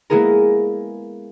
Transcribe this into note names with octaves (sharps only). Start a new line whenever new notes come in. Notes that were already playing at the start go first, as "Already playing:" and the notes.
G#3 A#3 B3 E4 G#4 A#4